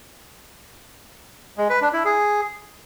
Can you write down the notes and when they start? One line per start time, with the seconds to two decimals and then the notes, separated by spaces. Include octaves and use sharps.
1.58 G#3
1.70 B4
1.81 D4
1.93 E4
2.05 G#4